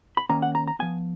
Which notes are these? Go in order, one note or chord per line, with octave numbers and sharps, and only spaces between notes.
B5
D#3 A#3 C#4 A#5
F#5
A#5
A#5
F3 B3 G#5